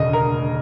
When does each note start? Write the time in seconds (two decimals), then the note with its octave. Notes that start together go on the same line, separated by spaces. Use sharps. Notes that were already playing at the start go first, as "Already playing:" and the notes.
Already playing: E1 D2 C#3 D#5
0.13 A#4